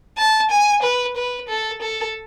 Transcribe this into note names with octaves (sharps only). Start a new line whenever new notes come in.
A5
G#5
B4
B4
A4
A4